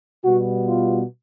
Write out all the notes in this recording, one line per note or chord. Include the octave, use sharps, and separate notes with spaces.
B2 G3 B3 F#4
F4